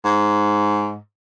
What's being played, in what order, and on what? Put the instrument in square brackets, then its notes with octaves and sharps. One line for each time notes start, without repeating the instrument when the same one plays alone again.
[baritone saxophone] G#2